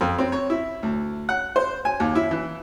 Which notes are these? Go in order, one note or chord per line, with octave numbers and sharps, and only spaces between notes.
F2
C4
C#5
E4
D2
F#5
C5
G#5
D#2
E4
E3